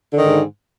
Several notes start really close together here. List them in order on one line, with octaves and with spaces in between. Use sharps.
D3 D#3 G#2